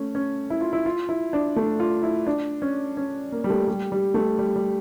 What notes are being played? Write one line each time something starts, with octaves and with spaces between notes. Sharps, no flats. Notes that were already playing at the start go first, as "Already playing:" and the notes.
Already playing: A3 C#4
C#4
E4
F4
E4
F4
E4
D4
A3
F4
E4
D4
C#4
C#4
A#3
G3
A3
G3
G3
A3
G3
G3